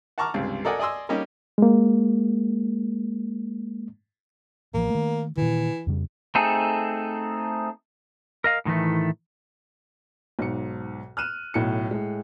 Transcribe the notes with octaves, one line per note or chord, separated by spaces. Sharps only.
F#5 A5 A#5 C#6 D6 F6
C#2 G2 C3
A4 A#4 D5 D#5 F#5 G#5
D5 D#5 G#5 C6 E6
G3 A#3 C#4 D#4 G4
G#3 A#3
A1 F3 A#3
D#3 A3
A#2 D#3 E3
F2 C#3 G3
A3 C4 D#4 G#4 A4
A#4 D#5 F5
A2 D#3 E3 A3
B1 G#2 C#7
F6 F#6 D#7 E7
B1 A2 C#7
A2 G#3